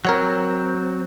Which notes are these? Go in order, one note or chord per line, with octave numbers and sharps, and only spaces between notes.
F#3 C4 A#4 C#5 F#5